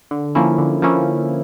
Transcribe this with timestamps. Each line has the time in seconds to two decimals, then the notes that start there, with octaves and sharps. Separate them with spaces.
0.11 D3
0.35 F3 A#3 C#4 E4
0.58 D3
0.82 F3 A#3 C#4 E4